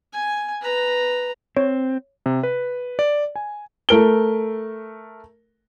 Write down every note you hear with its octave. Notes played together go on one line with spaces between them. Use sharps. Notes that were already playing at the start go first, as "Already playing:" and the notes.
G#5
B4 A#5
C4 C#5
C3
B4
D5
G#5
A3 A4 A#4 D7 G7